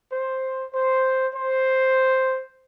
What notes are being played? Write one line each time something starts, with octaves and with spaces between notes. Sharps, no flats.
C5
C5
C5